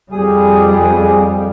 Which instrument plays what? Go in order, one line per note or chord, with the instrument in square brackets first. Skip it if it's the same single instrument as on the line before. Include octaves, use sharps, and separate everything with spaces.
[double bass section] F2 G3 [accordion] G#4 D#6